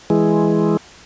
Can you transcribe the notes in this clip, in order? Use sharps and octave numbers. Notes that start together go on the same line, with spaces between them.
E3 G#3